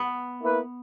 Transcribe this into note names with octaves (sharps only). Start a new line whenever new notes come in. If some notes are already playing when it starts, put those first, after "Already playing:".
Already playing: B3
A#3 E4 B4